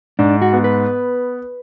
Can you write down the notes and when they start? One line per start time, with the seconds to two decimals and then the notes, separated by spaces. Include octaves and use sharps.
0.19 G#2 D4
0.42 F#4
0.53 B3
0.64 B4